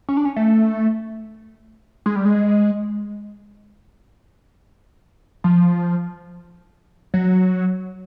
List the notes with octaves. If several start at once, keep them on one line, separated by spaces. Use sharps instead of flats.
C#4
D4
C#4
A3
G#3
G3
G#3
F3
F#3